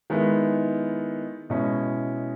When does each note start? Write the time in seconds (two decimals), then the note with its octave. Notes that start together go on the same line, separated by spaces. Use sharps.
0.10 D#3 G#3 B3 E4
1.50 B2 G#3 C#4 E4